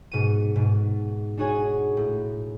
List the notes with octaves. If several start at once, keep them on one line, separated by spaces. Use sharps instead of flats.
G#2 B2 C#7 D#7
G#2 B2
D4 D#4 F#4 G#4 C#5 G#5
A2